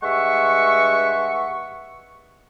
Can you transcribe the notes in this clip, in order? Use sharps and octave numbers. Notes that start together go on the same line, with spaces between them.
G2 G#3 E5 F#5 C#6